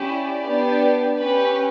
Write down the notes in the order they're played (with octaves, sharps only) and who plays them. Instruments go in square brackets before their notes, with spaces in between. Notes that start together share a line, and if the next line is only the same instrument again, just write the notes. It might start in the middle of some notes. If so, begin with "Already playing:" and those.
Already playing: [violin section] C#4 E4 G4
D5
B3 D4 G4
C#4 G4 B4